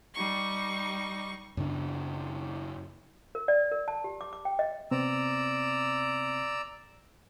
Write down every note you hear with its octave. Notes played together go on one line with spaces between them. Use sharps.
G3 D#4 C#6
F#2 C#3 D4
A#4
D5
A#4
A5
G4
D6
D6
G5
D#5
C3 B3 C4 D5 A#5 E6